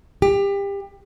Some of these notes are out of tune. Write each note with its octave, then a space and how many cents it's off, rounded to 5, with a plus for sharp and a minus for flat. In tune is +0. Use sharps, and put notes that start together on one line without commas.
G4 +25